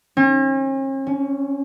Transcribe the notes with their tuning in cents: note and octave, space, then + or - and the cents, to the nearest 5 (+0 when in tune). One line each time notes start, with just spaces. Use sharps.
C#4 -45
C#4 +20